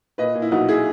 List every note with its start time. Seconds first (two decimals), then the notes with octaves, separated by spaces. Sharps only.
0.18 A#2 B4 D#5
0.35 A#2
0.42 E4
0.51 B1 D#4 F#4
0.68 E4 G#4